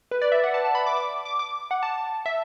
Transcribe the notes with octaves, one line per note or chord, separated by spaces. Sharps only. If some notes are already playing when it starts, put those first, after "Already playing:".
B4
D5
E5
F#5
A5
A5
B5
D6
D6
D6
D6
F#5
A5
E5